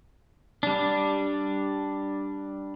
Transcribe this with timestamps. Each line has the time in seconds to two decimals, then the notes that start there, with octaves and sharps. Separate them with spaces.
0.63 G3 D4